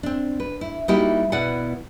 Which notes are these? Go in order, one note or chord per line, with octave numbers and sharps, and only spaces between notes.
C4 D4
B4
E4
G3 A#3 D#4 E4 F#4 G4
B2 E4 B4 D5 F#5